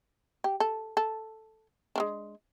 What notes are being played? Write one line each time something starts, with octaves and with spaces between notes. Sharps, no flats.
G4
A4
A4
G#3 C#4 D4